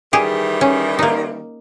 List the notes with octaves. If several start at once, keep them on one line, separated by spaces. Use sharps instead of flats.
D#3 E3 G3 G4 G#4
C#4
A#3 D#4